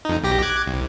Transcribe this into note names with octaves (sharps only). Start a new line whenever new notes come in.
F2 D#4
B1 G4 A#6
D6 F#6 G#6
C2